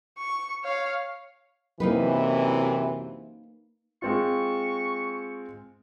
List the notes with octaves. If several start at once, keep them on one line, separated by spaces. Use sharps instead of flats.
C#6
C#5 F5
F#2 C3 E3 A#3 D#4 B4
G#3 C4 F4 C#6